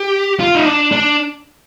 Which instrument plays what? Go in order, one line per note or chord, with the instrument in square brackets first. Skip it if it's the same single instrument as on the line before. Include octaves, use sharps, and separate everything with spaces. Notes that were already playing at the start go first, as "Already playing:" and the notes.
Already playing: [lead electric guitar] G4
F4
D#4
D4
D4